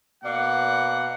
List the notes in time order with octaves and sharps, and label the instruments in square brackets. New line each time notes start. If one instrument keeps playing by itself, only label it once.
[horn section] B2 A#3 D5 F#5